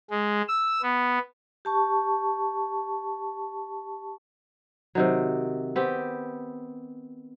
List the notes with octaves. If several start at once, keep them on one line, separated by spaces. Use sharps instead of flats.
G#3
E6
B3
G4 A5 C#6
C3 D#3 F#3
B3 C4 G4